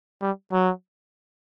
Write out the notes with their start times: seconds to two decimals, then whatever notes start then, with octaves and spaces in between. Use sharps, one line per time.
0.22 G3
0.53 F#3